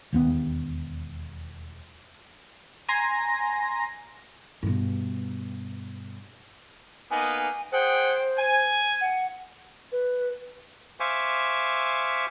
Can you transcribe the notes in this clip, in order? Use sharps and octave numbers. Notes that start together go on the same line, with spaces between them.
E1 D#2 B3
G#5 A#5 C6 A#6
G2 B2
A#3 B3 D#4 G#5
G#4 C5 F#5 G5
G#5
F#5
B4
C5 E5 F5 G#5 C#6 D6